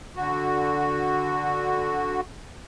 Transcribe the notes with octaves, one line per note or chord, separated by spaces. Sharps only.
D3 F#4